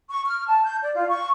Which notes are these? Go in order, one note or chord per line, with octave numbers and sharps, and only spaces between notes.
C#6
F6
A5
G6
D5
F4
C#6